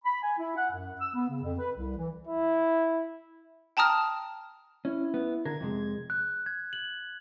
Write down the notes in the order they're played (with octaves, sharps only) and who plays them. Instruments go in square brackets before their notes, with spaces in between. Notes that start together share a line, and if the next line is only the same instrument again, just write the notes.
[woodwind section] B5
G#5
E4
F#5
F#2
E6
B3
C#3
F2
B4
C2
E3
[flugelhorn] E4
[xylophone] G5 A5 A#5 D#6 F6
[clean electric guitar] C#4 [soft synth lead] E4
[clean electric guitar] B3
[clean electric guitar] D3 A#4 [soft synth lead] G#6
[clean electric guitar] F2 C3 G#3
[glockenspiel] F#6
G#6
F#7